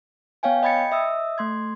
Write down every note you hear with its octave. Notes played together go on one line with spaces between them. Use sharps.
B3 C#5 F5 G5 G#5
D#5 G5 B5 G#6 A6 C#7
D#5 E5 D#6 E6
A3 C6 G#6